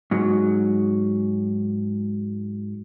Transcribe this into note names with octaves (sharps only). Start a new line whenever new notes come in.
G#2 F#3